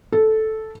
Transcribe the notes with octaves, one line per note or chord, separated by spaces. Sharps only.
A4